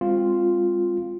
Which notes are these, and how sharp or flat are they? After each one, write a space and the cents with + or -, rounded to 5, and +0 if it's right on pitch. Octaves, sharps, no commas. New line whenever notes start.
G#3 -40 C4 +0 F4 +0